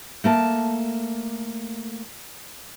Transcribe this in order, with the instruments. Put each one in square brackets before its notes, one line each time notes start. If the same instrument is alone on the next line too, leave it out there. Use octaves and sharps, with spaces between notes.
[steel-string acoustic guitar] A3 A#3 A5